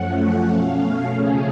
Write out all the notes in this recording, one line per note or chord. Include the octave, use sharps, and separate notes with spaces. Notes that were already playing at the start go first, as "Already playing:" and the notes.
Already playing: F#2 F3 A3 C#4 F#5
B2 A3 C#4 F5
C#3 F3 A3 C#4 G#4